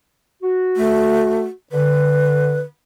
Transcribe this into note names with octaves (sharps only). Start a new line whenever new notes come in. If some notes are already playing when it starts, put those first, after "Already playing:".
F#4
A3
D3 B4